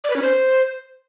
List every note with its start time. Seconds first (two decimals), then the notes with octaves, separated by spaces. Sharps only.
0.04 D5
0.10 B4
0.16 C#4
0.22 C5